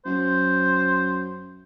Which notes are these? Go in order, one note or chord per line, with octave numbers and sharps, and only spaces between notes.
F#2 C5